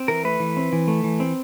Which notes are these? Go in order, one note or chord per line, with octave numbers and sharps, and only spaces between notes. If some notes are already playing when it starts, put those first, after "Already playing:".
Already playing: C4
E3 A#4
A3 B4
E3
C4
E3
A3
E3
C4